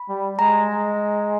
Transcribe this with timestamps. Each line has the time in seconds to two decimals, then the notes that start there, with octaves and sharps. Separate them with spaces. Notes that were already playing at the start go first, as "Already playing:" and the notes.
Already playing: B5
0.09 G3
0.39 G#3 A#5